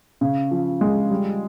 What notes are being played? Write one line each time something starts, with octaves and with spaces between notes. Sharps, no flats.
C#3
F3
G#3
G3